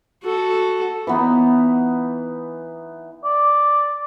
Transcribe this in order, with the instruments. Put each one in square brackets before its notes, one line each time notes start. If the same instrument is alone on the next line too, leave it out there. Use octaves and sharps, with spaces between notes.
[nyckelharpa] F#4 A4
[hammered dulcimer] E3 B3 D#4
[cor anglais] D5